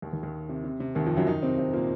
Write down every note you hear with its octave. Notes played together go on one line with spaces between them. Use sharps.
D#2 D#3
D#2 D#3
D#2 D#3
C3
C3
C3
D#2 D#3
F2 F3
F#2 F#3
D#3 D#4
C3 C4
C3 C4
A#2 A#3